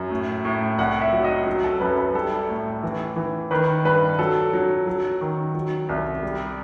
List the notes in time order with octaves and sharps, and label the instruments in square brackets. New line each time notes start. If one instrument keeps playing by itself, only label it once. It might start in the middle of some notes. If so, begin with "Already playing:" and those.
Already playing: [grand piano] F#2
A2
A2
C2 F#5
E5
F#3
D#5
F#3
A4
F#2 B4
B4
G3 A4
A2
E3
E3
D#3 B4
G2 B4
F#3 A4
F#3
F#3
D#3
F#3
C2
G3